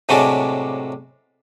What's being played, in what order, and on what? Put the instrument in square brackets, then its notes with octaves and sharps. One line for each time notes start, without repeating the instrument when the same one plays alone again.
[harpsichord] A2 C3 F#3 G#3 D4 F#4